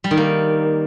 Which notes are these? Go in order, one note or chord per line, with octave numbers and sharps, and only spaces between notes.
G3
D#3
A#3